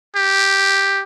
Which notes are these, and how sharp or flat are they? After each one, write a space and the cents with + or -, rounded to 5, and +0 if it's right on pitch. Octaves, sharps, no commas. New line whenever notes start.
G4 +0